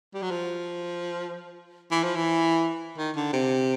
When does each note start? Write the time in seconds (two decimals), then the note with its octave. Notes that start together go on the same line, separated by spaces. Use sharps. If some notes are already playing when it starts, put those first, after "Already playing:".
0.14 G3
0.22 F#3
0.31 F3
1.91 E3
2.03 F3
2.16 E3
2.98 D#3
3.16 D3
3.33 C3